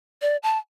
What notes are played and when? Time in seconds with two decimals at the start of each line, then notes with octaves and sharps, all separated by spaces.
0.22 D5
0.43 A5